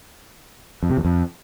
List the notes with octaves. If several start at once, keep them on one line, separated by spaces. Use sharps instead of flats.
F2
C3
E2
F2